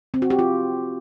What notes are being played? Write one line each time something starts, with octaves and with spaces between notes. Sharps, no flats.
C4
F#4
G4
F4